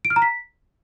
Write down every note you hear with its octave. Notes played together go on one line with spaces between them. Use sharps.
D7
F6
A#5
B6